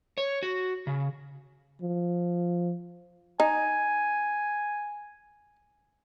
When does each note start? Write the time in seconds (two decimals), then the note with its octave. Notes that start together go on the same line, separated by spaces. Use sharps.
0.18 C#5
0.43 F#4
0.87 C#3
1.81 F3
3.40 D#4 G#5